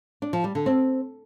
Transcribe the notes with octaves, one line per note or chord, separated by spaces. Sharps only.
D4
F3
G3
D3
C4